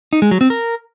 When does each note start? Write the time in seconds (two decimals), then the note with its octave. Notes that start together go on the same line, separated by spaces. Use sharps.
0.13 D#4
0.22 G#3
0.31 F#3
0.41 C4
0.50 A#4